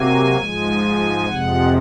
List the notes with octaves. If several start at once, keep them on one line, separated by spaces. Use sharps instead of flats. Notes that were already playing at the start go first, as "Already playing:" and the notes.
Already playing: C3 F#3 A#3 G#5
G#2 F3 G#3
F2 C3 F3 G#3 F#5